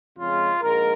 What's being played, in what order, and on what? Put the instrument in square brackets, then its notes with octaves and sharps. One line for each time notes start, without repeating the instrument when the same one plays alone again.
[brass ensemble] F2 C#3 G#3 C#4 F4
A#1 G#2 G#3 A#4